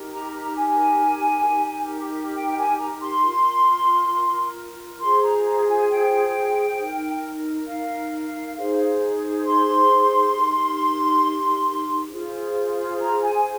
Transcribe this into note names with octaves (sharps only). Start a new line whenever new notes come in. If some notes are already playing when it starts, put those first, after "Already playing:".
Already playing: D#4 G4 A#4
A#5
A#5
G#5
D#4 G4 A#4
G5
G5
G#5
A#5
C6
F4 A#4
F4 G#4 C5 C6
A#5
A#5
G#5
G5
D#4 A#4
F5
D#4 G#4 C5
C6
D#4 G4 A#4
F4 G#4 C5
A#5
G#5
G#5